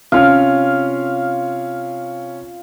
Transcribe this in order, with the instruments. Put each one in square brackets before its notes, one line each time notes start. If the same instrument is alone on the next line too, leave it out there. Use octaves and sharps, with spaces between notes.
[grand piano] C3 C#4 F6 [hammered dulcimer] F4 F5